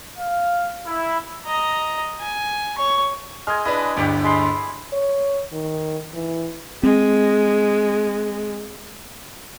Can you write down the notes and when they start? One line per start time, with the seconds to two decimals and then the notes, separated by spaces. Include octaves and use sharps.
0.18 F5
0.86 E4
1.46 D#5 A#5
2.21 G#5
2.78 C#5 C#6
3.47 G#3 D#5 G#5 F6
3.65 D4 E4 B4 D#5
3.96 G1 D2 G2 G4 D5
4.24 G#3 B5 C6
4.93 C#5
5.53 D#3
6.14 E3
6.83 G#3 C4